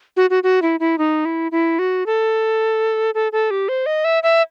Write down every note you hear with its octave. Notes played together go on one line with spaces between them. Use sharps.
F#4
F#4
F#4
E4
E4
D#4
E4
E4
F#4
A4
A4
A4
G4
C5
D#5
E5
E5